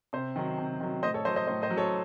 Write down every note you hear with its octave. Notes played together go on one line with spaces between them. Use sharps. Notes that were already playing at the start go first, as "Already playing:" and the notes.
C3 C5
D#3 F#3
C3
D#3 F#3
A2 C5 D#5
A4 C#5
F#3 C5 D#5
C5 D#5
A2 C5
C5 D#5
F#3
A4 C#5